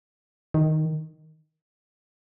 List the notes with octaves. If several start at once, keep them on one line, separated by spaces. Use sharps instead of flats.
D#3